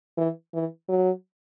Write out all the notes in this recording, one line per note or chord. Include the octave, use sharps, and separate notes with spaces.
E3
E3
F#3